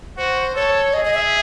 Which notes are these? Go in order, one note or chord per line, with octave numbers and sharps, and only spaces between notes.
F#4 C5
A4 C#5
G#4 D#5
D#5
E5